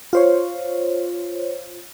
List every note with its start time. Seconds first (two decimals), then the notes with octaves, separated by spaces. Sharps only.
0.13 F4 C5 C#5